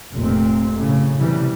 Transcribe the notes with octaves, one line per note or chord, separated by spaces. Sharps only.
F1 A#2 C4
F#2 A2 C#3
C3 E3 G3